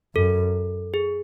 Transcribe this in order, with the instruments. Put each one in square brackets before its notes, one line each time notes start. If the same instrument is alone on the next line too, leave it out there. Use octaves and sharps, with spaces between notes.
[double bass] F#2 [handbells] A4
[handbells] G#4